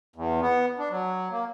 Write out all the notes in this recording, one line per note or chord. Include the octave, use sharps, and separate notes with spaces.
E2
B3
D4
F#3
A#3